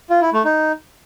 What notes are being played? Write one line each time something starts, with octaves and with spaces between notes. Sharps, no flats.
F4
E4
A3
D#4